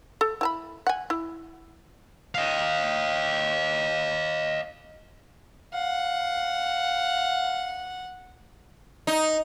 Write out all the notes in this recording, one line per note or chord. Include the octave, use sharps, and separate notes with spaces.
A4
E4 A5 B5
F#5 G#5
E4
D#5 F5
F5 F#5
D#4